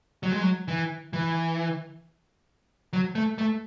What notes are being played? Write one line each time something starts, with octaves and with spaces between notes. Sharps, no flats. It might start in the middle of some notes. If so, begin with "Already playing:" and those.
F#3
G#3
F#3
E3
E3
F#3
A3
A3